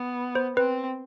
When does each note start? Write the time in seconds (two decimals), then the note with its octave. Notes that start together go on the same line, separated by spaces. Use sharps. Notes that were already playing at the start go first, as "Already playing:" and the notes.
Already playing: B3
0.35 C5
0.57 C4 B4